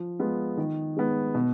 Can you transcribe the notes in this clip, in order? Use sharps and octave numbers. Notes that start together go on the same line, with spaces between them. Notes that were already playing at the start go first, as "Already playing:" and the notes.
Already playing: F3
G#3 B3 F4
D#3
G#3 B3
B2